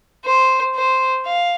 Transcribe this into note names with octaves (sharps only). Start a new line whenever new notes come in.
C5
C5
F5